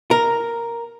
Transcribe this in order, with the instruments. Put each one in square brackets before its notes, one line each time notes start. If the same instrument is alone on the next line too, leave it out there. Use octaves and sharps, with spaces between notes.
[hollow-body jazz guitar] A#4